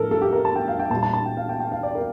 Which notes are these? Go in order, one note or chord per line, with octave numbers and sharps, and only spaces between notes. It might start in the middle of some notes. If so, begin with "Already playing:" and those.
Already playing: A2 F3 A4 A#4
A4
G4
A#4
A5
G5
F5
G5
A#2 G3 A5
A5
A5
G5
F5
G5
G5
F5
D5
A#4